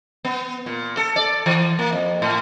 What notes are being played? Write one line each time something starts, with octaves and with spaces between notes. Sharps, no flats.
B3
A#2
A4
D5
E3
A#3
F2
A2